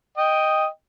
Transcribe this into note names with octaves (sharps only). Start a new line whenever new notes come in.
D#5 G5